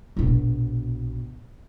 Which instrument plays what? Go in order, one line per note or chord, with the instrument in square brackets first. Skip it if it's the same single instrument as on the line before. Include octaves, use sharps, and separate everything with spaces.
[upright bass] A#1 B2